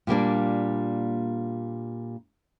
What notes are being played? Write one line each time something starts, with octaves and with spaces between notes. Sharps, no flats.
A#2 G3 A#3 D4